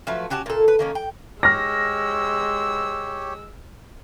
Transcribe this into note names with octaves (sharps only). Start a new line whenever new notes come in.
F3 F#3 A3 B4
C#4 F#4 G4 A5
A#2 A4
B4
D#3 A#3 C#4
G5
G#3 G4 C#5 E6 F6 A#6